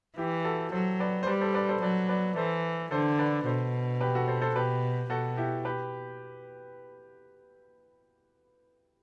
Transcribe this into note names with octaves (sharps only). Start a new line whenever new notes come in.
E3 E4 G4
F#4 A4
F#3 A4 C5
B4 D5
C5
G3 B4 D5
A4 C5
B4 D5
A4 C5
F#3 B4 D5
B4 D5
E3 A4 C5
D3 A4 C5
B4 D5
B2 A4 C5
G4 B4
F#4 A4
A4 C5
A4 C5
B2 G4 B4
B2 F#4 A4
E4 G4
G4 B4